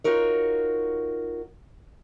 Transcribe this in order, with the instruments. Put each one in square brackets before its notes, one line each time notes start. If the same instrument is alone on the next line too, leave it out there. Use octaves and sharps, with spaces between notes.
[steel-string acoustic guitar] D#4 F4 F#4 A#4 C#5